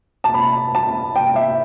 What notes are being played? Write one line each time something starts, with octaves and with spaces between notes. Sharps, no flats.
A5
B5
A5
G5
E5